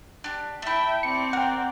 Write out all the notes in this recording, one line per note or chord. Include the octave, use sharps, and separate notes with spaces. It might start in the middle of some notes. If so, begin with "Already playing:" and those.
D4 G4
A3 E4 E5 G5
C4 D5 C#7
A#4 F#5 G5